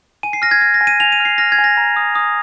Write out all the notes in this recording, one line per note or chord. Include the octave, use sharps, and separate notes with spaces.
G#5 D#7
C7
F6 A#6
G#6
F6 A#6
A#6
G#5
D#7
G#5 F7
D#7
F6
C7
F6 A#6
G#6
G#5
A#6
A#5
D#6
D#6